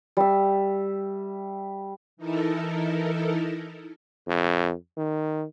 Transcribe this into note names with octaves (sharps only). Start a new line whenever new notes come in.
G3 E5
E3 D#4 E4 A4 A#4
F2
D#3